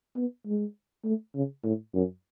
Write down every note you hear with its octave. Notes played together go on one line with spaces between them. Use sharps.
B3
G#3
A3
C#3
A2
F#2